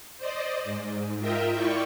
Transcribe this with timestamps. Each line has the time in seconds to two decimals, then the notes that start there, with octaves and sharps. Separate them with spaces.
0.18 C5 D5 D#5
0.64 G#2
1.20 F4 A#4 D#5 E5 G5
1.53 E4 F4 D5 G5 C#6